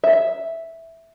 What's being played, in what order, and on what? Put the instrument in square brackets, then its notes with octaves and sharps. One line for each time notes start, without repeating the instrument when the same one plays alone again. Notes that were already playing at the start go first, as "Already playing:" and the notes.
[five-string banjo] E5